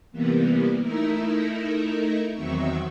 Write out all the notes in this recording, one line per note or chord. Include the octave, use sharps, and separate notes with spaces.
C3 E3 G3 A#3 B3
A3 D#4 E4 A#4 E5
E2 D#3 F#3 C4 E5 C#6